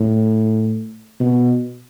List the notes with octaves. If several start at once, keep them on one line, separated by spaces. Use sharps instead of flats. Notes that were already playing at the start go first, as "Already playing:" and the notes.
Already playing: A2
B2